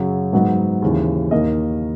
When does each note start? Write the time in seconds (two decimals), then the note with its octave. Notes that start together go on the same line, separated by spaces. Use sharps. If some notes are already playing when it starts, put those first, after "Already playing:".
Already playing: F#2 C#3 F#3
0.33 G#2 F#3 B3 D#4
0.82 D#2 C#3 E3
1.31 D#2 D#3 A#3 D#5